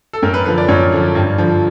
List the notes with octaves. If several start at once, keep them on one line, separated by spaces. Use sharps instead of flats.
A4
F#2 A#4
B4
D3 F3 B4
D5
F#2 C#5
D3 F3
G2
D3 F3